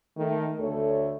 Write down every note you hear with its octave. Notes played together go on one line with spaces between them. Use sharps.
D#3 A3
D2 A3 A4 C#5